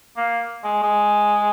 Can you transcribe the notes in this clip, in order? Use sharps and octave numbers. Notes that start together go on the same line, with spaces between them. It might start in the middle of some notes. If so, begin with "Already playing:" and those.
A#3
G#3
G#3